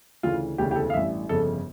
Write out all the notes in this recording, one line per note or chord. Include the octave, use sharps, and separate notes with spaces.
D2 C#3 E3 F4
E1 D2 C#3 E3 G4
G4
A4
F5
A1 G2 E3 E5
G1 F2 C#3 A4